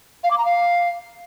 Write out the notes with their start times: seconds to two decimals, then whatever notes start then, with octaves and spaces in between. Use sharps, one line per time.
0.23 F5
0.30 D6
0.37 A#5
0.44 F5